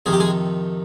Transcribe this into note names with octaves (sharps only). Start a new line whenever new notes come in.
F2 C3 D#3 G#4
G4
G#3 G#4